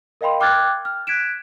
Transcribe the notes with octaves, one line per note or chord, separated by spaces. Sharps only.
A#4 D#5 F5 G5 B5 C6
G5 D6 F6 F#6 G#6 A6
F6
F#6 G#6 B6 D7 E7